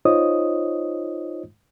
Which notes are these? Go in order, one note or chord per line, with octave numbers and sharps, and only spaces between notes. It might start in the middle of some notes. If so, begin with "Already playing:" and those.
D#4 F4 C5 C#5 D#5 D#6